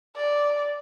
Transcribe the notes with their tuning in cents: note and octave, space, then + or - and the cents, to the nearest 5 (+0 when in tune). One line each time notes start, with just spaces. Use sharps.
D5 -5